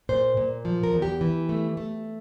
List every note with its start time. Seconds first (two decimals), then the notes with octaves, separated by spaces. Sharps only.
0.09 A#2 C5
0.37 A#2
0.65 F3
0.83 A#4
0.93 E2
1.02 G4
1.21 E3
1.49 A3
1.77 A3